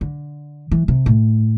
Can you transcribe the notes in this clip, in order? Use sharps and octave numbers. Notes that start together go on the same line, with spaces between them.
D3
E3
C3
A2